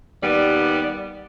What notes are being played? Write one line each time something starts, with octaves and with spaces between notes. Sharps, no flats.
D#2 G3 B3 D5